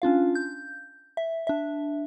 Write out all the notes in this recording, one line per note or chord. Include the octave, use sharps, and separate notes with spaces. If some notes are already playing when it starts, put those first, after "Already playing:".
C#4 D4 F4 F5
G6
E5
D4 E5